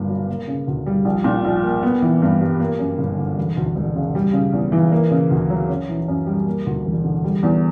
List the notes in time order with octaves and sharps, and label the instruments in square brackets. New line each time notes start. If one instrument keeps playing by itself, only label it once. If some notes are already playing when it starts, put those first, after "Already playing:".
Already playing: [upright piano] G1 G2 A#3
F#3
A#3
C#3
D2
G3
A#1
A#2
A#1
A#3
B3
E3
G2
G3
A#3
F#2
G1
D3
E1
D2
E1
C#3
G3
C#3
E2
E3
A#3
C#3
D2
F#3
C#4
E3
F#2
G3
A#3
D2
E1
D3
G3
E2